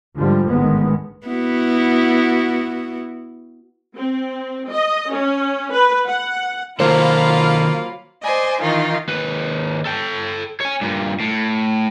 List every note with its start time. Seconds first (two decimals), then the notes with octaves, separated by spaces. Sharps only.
0.15 G#2 D3 F3 G3
0.50 A1 G#2 D3 D#3 G#3 B3
1.27 B3 E4 F#4
3.96 C4
4.71 D#5
5.12 C#4
5.72 B4
6.07 F#5
6.80 D#3 F#3 A#3 F4 A4 C5 F5 B5
8.25 C5 D5 D#5 G#5
8.62 D#3 E3 D#4 F4
9.08 D#2 B4
9.85 A4 G5
10.61 C#5 G#5
10.81 G2 A#2
11.20 A2